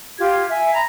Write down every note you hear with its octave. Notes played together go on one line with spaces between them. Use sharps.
F4 G4 G#6
E5 G#5
A#5 B5